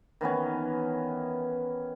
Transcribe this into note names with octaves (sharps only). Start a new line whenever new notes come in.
D#3 E3 B3 C#4